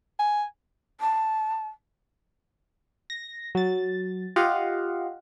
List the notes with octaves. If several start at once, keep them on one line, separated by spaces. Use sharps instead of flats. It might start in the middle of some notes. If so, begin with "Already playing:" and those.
G#5
A5
A#6
F#3 A6
F4 G4 D#5 F5 F#5